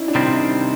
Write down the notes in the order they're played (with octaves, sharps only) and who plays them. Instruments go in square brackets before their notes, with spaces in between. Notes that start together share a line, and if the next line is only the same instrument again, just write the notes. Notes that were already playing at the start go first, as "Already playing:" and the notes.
Already playing: [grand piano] C#4 D#4 E4
D4
[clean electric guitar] C3 D#3 G3 C4 [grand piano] D#4